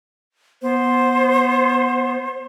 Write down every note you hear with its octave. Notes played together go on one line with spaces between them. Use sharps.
B3 C5